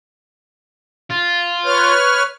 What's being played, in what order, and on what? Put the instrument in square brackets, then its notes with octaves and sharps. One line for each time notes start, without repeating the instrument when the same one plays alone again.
[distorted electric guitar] F4
[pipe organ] B4 C#5 F6